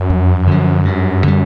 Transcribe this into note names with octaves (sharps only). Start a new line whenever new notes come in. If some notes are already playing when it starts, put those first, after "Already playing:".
Already playing: F#2
F2
D3 F3
G2
D3 G3